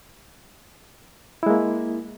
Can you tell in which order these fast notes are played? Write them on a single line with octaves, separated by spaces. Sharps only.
E4 G#3 A#3